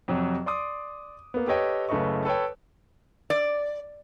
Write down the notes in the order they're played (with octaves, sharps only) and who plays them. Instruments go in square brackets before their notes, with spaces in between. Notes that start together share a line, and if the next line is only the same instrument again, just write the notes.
[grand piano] F2 C3 F#3
D5 C6 D6 D#6
A#3 B3
G4 A4 B4 C#5 D#5 G5
F#1 C#3 A3 B4 D#5 C#6
A4 B4 C#5 G5
[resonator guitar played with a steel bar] D5